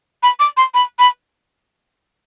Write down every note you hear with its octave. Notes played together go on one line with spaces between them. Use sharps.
B5
D6
C6
B5
B5